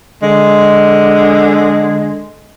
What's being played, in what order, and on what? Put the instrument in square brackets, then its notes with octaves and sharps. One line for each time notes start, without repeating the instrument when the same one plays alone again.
[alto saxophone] D3 [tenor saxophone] G#3